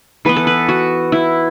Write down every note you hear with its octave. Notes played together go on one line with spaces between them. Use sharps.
E3 B3 B4
A4
B4
F#4
E4